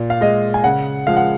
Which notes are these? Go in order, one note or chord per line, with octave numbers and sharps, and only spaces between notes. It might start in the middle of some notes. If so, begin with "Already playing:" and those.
Already playing: A#2
F5
G#3 D#5
G#5
C#3 F#5
F3 G#3 F5
F#5